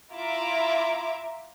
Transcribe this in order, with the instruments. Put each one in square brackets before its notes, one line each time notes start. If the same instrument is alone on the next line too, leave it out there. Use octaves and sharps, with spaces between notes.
[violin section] E4 F4 E5 A#5 D6